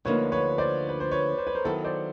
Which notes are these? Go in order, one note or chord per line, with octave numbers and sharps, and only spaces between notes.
D2 D3 F3 A#3 D#4 B4 C#5
B4 C#5
C5 D5
B4
C5
B4 C#5
C5
B4
A#4 C5
D#3 F#3 B3 E4 A4 B4
C5 D5